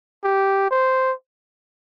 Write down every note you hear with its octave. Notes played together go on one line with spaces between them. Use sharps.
G4
C5